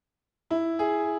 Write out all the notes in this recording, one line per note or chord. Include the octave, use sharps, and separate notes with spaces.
E4
G#4